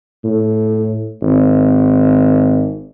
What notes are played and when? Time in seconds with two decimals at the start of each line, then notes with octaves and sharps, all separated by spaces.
0.24 A2
1.22 G#1